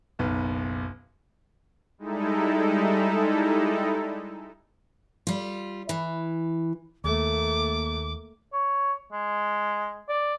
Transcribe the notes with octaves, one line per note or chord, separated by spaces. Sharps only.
F#1 B1 B4
G3 G#3 D#4 E4 A4
G3 F4
E3
D#2 A3 A#3 D6
C#5
G#3
D5